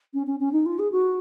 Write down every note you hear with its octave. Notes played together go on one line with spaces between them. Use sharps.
C#4
C#4
C#4
D#4
F4
G#4
F#4